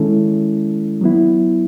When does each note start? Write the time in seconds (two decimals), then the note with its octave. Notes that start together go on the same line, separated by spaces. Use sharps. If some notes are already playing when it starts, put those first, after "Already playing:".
Already playing: D#3 G#3 C#4 E4 A4
1.01 F#3 B3 E4